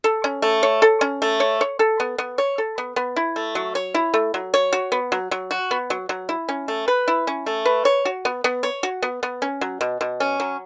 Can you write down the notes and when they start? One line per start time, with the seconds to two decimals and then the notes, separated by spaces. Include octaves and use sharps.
0.04 A4
0.24 C#4
0.42 A3
0.63 C#5
0.82 A4
1.01 C#4
1.22 A3
1.40 C#5
1.61 C#5
1.79 A4
2.00 B3
2.18 B3
2.38 C#5
2.58 A4
2.78 B3
2.96 B3
3.16 E4
3.36 A3
3.55 F#3
3.75 C#5
3.94 E4
4.14 A3
4.34 F#3
4.54 C#5
4.73 F#4
4.92 B3
5.12 F#3
5.31 F#3
5.51 F#4
5.71 B3
5.90 F#3
6.09 F#3
6.29 E4
6.49 C#4
6.68 A3
6.88 B4
7.08 E4
7.27 C#4
7.46 A3
7.66 B4
7.85 C#5
8.05 F#4
8.25 B3
8.44 B3
8.63 C#5
8.83 F#4
9.02 B3
9.23 B3
9.42 C#4
9.61 F#3
9.81 B2
10.01 B2
10.20 C#4
10.40 F#3